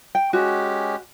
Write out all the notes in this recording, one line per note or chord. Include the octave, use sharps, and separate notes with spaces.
G5
G#3 C#4 F#4 G4